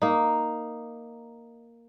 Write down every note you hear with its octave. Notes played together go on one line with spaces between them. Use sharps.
A#3 D#4